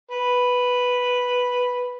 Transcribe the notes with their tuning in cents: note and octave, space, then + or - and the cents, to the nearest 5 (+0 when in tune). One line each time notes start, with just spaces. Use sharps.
B4 +0